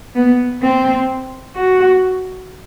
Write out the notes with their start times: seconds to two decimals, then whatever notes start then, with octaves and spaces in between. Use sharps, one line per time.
0.15 B3
0.62 C4
1.55 F#4